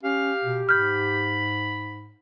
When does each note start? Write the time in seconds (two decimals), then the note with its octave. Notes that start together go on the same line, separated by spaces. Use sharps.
0.04 C#4 G4 F5
0.44 B2
0.69 G#2 B5 F6 G6